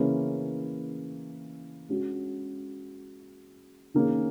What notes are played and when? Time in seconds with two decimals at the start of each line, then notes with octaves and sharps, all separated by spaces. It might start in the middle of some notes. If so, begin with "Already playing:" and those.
Already playing: C#3 E3 A#3 C#4 E4
1.89 G#3 C#4 F#4
3.94 D#3 A#3 C#4 G#4